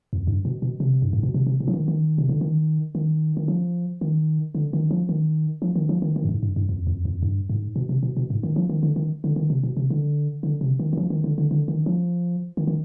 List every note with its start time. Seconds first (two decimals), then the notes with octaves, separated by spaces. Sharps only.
0.13 F2
0.27 G2
0.45 B2
0.62 B2
0.80 C3
1.02 G2
1.13 G#2
1.23 B2
1.34 C3
1.47 C3
1.60 B2
1.68 F3
1.74 D#3
1.88 D#3
2.18 C3
2.29 D3
2.41 D#3
2.95 D#3
3.37 D#3
3.48 F3
4.01 D#3
4.55 D3
4.73 D#3
4.91 F3
5.09 D#3
5.62 F3
5.76 D#3
5.89 F3
6.02 D#3
6.16 D#3
6.24 G2
6.29 G#2
6.43 G2
6.56 G2
6.69 F2
6.87 F2
7.05 F2
7.23 G2
7.50 G#2
7.76 B2
7.89 C3
8.03 B2
8.17 B2
8.30 G#2
8.43 D#3
8.56 F3
8.69 D#3
8.83 D3
8.96 D#3
9.24 D3
9.36 D#3
9.50 C3
9.63 B2
9.77 C3
9.90 D3
10.43 D3
10.61 C3
10.79 D#3
10.93 D#3
10.97 F3
11.10 D#3
11.24 D3
11.38 D3
11.51 D3
11.68 D#3
11.86 F3
12.57 D#3
12.67 D#3